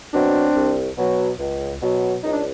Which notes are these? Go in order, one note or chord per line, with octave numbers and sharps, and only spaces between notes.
B2 F#3 C4 D4
C2
B2 F#3
C#2
B2 F#3
C#2 D#4
D4